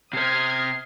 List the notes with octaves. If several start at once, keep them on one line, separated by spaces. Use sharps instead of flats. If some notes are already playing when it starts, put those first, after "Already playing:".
C3 C5 D#6 F6 G#6 C7